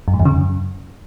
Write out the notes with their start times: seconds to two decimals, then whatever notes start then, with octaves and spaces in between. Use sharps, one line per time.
0.08 F#2
0.14 G#2
0.20 E2
0.25 C#3
0.31 F#2